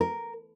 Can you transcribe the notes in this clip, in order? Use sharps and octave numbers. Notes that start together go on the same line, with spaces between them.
A#4